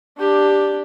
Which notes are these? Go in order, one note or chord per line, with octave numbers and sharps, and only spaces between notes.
D4 G4